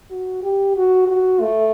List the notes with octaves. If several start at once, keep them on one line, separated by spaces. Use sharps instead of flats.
F#4
G4
F#4
F#4
A3